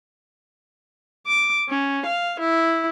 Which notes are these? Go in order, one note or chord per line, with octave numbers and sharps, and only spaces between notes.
D6
C#4
F5
E4